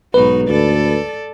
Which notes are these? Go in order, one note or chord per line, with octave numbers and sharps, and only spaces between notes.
B1 G#2 D#4 F#4 B4
D2 A4 D5